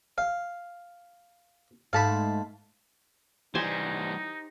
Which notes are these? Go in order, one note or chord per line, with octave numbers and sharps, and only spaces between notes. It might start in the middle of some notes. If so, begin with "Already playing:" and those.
F5
G#2 A3 F5 A5 B5
E3 G3 D#4 G4 C5 G#5